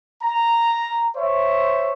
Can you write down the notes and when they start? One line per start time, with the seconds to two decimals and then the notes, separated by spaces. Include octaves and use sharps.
0.22 A#5
1.15 C5 C#5 E5